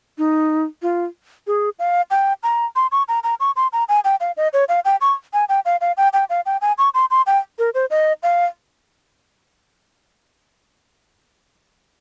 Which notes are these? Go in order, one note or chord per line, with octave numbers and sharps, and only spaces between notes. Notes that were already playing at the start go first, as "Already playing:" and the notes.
D#4
F4
G#4
F5
G5
A#5
C6
C#6
A#5
A#5
C#6
C6
A#5
G#5
G5
F5
D#5
C#5
F5
G5
C#6
G#5
G5
F5
F5
G5
G5
F5
G5
G#5
C#6
C6
C6
G5
A#4
C5
D#5
F5